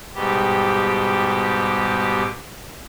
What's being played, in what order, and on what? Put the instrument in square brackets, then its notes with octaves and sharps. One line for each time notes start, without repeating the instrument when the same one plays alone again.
[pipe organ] G#2 B2 G3 G4